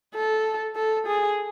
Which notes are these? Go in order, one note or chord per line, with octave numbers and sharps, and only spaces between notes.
A4
A4
G#4